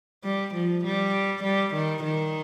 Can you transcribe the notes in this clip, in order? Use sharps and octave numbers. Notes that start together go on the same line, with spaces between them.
G3
F3
G3
G3
D#3
D#3